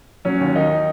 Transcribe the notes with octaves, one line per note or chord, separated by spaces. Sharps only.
F#3 C#4
D#2
D#3 D#4